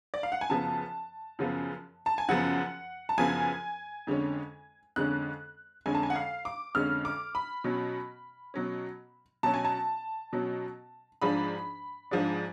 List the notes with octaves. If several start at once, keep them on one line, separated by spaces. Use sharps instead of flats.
D5
F5
F#5
G#5
F#2 C#3 F3 B3 A5
F#2 C#3 F3 B3
A5
G#5
F#2 C#3 F3 B3 F#5
A5
F#2 C#3 F3 B3 G#5
F2 D3 G#3 C#4
F2 D3 G#3 C#4 F#6
F2 D3 G#3 C#4 G#5
A5
G#5
F#5
F5
D6
F2 D3 G#3 C#4 F6
D6
B5
B2 F#3 C#4
B2 F#3 C#4
B2 F#3 C#4 A5
G#5
A5
B2 F#3 C#4
G#2 F3 G#3 D4 B5
G#2 F3 G#3 D4